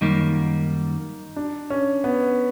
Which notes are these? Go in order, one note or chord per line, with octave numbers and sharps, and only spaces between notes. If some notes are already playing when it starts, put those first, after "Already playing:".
F#2 D#3 G3 A#3 D#4
D4
C#4
B3